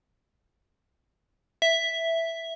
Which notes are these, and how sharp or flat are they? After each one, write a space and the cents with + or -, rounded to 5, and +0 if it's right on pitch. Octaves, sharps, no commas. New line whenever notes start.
E5 +0